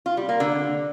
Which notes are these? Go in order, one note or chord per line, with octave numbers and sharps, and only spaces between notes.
F4
G3
A#3
D3